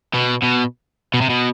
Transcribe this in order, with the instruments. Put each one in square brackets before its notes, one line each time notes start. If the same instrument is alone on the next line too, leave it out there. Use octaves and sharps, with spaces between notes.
[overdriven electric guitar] B2
B2
B2
C3
B2